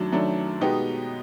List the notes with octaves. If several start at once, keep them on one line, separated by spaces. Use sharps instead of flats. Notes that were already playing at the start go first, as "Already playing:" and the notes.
Already playing: F#2 D#3 F#3 A3 D4
F#2 D#3 F#3 A3 D4
B2 G#3 B3 D#4 G4